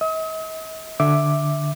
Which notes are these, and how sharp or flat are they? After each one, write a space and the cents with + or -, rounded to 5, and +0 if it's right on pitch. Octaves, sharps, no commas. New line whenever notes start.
D#5 +45 D#6 +40
D3 +0 E5 +0 D6 +0